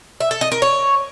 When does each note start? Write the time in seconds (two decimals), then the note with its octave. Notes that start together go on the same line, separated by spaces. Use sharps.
0.20 E5
0.31 A4
0.41 D#5
0.52 A#4
0.62 C#5